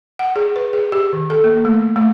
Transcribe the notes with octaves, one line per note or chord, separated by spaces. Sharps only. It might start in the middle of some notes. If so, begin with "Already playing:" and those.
F#5
G#4
B4
G#4
G4
D#3
A4
A#3
A3
A3